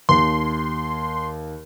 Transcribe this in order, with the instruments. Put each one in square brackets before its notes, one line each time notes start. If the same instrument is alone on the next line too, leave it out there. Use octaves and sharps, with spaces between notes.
[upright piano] D#2 [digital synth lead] C6